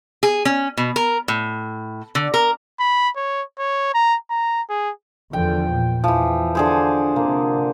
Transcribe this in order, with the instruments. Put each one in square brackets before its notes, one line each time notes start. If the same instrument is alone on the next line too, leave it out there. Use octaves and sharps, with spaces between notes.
[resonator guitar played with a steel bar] G#4
C#4
B2
A#4
A2
D3
A#4
[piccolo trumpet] B5
C#5
C#5
A#5
A#5
G#4
[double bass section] E2 D3 F3 [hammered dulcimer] G5
[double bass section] A#2
[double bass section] E2 [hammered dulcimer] E3 F3
[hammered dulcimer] D3 G#4 C5
[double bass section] C3 [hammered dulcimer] A#3